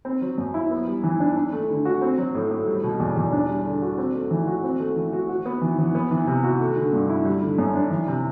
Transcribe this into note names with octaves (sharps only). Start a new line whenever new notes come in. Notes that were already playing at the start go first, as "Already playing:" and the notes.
C4
F#3
F#2
E4
B3
G3
E3
D4
D4
A3
D3
F#4
C4
F#3
A2
A2
G3
B2
E2
E2
D4
G3
D3
F#4
C4
A3
E3
F#4
C4
A3
E3
F#4
F#4
B3
E3
E3
B3
E3
C3
F#4
A3
D3
G2
E4
G3
D3
F#2
D4
E3
C3